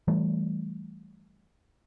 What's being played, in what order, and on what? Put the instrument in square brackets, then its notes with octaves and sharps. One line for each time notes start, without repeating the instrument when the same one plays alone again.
[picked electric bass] E3 G3 A3